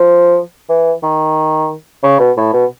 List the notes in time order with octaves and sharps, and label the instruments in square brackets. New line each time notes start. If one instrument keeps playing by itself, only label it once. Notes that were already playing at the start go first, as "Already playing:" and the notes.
Already playing: [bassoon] F3
E3
D#3
C#3
B2
A2
B2